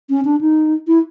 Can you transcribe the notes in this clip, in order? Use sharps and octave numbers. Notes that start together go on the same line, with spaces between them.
C#4
D4
D#4
E4